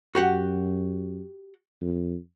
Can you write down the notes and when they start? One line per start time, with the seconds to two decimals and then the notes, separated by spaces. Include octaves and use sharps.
0.15 F#2 F#4 G4 F#5
1.81 F2